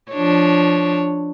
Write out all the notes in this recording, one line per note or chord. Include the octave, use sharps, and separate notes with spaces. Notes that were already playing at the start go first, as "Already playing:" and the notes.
F3 D4 C#5